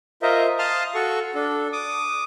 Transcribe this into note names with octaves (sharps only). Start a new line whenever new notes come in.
F4 A#4 C5 D#5 E5
F5 A5 C6 D#6 F6
F#4 A4 C#6
D4 A4
D6 D#6